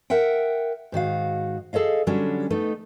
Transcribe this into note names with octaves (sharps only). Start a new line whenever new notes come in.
A#4 E5 F#5 G5
G#2 D#3 F#4 F5
G#4 A4 C#5 D#5 F5
D3 F#3 G3 C#4 D4
A3 B3 D#4